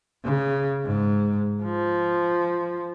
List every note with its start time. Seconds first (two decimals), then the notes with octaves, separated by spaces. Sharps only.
0.24 C#3
0.85 G#2
1.63 F3